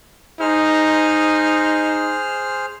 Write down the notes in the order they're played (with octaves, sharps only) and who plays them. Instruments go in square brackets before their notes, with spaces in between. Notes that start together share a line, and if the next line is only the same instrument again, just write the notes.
[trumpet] D#4 [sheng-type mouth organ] G#4 C5 F6